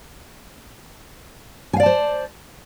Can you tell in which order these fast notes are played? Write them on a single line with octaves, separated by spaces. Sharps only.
G#5 F5 D5 A5 C5